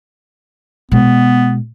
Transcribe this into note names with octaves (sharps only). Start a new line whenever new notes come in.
B2 G#3 B3